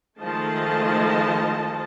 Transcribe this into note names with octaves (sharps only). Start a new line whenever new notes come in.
D#3 F3 G#3 A3 D#5 A5